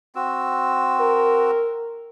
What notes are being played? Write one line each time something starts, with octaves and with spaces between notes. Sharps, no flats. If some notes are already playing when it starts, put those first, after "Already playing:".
C4 F#4 E6
A#4